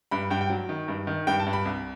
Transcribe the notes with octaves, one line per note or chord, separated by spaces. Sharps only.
G2 B5
G2 G5
G5
F#3
D#3
G2
D#3
G2 G5
A5
G2
B5
C2